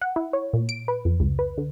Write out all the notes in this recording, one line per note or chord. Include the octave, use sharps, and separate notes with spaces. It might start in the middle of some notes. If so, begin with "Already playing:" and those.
F#5
E4
C#5
A#2
D7
B4
F2
C#2
B4
D3